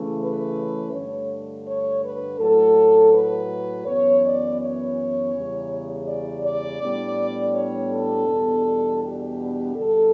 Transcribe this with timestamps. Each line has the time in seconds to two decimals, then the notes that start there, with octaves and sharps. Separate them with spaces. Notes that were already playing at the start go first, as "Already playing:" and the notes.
Already playing: C#3 E3 A3 C#4
0.19 B4
0.91 G2 D3 A3 C#5
1.66 C#5
2.03 B4
2.39 A2 F#3 A3 A4
3.13 B4
3.86 F#2 E3 B3 C#5
4.23 D5
4.60 C#5
5.33 E2 C#3 G3
6.07 D5
6.43 D5
6.80 A2 G3 B3 D4
7.54 C#5
7.90 A4
8.28 E2 B2 G3 B3 D4
9.02 G4
9.75 G2 D3 G3 A4